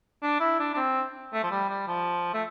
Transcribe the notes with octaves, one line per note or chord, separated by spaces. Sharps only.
D4
E4
D4
D4
C4
A3
F3
G3
G3
F3
A3